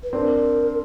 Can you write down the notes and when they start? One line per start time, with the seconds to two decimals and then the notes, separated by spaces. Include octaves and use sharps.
0.03 B4
0.13 C4 D4 A#4